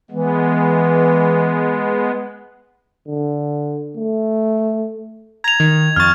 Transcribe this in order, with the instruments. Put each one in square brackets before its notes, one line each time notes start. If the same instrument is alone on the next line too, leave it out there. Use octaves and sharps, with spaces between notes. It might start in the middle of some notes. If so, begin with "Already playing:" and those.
[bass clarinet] E3 [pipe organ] G#3 B3
[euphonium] D3
A3
[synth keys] A#5 [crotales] G#6 F7
[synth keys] D#3
[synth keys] F2 A6 [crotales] C#6 F6